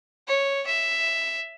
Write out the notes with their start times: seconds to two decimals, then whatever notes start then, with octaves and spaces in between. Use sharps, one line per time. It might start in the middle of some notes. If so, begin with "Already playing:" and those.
0.28 C#5
0.67 E5